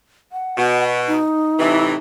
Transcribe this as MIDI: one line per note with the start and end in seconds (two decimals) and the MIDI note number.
0.32 1.00 78
0.57 1.18 47
1.07 1.97 63
1.59 1.94 45
1.59 1.94 48
1.59 1.94 52